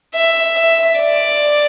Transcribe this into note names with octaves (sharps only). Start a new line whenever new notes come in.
E5
E5
D5